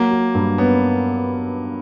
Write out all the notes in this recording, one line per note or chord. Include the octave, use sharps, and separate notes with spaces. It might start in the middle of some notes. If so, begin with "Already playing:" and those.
Already playing: F#3 A#3
F#4
G2
B3 C#4